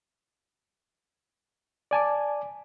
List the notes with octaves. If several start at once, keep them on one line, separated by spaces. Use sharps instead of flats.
D5 G#5 A5 D6